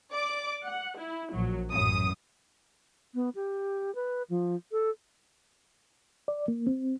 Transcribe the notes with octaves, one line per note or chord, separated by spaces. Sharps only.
D5 D6
F#5
E4
A#1 F#3
A1 F#2 D#6
B3
G4
B4
F3
A4
D5
A#3
C4